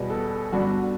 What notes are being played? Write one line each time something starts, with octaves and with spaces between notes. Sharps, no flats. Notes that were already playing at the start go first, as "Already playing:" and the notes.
Already playing: E2 B2 G3 B4
A4
G2 D3 G3 B3 D4 F#4